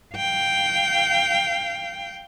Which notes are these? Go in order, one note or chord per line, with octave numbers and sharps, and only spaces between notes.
F5 G5